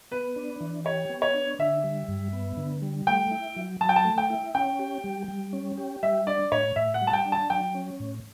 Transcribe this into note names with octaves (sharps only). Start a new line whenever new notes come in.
B3 B4
D4
E3
G4 C#5
B3
C#5
D4
D3 E5
G3
G2
B3
D3
G3
A3 G5
E4
F#3
F#3 A5
G5
A5
A3
G5
E4
C#4 G5
G4
G3
G3
C#4
G4
G3 E5
D4 D5
A2 C#5
A2 E5
F#5
G3
A5
G5
D4
A5
F#3 G5
C#4
A2